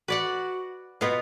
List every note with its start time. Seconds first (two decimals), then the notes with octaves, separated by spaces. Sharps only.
0.08 F#4 B4 D5 F#5
1.01 B2 B3 F4 B4